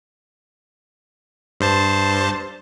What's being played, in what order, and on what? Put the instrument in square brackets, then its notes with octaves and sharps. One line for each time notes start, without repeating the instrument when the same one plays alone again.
[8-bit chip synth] G2 C5 A5